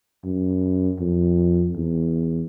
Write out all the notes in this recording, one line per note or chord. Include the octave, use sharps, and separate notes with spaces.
F#2
F2
E2